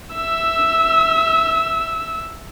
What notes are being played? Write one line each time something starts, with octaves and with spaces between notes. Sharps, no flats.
E5 E6